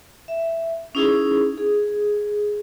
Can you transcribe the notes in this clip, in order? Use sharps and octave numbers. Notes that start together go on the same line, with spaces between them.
E5
C#4 D#4 E4 G#4
G#4